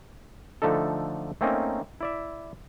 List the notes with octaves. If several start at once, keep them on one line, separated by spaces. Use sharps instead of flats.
D3 F3 A3 D#4 A4
A3 A#3 C4 C#4 D#4
E4 D5 E5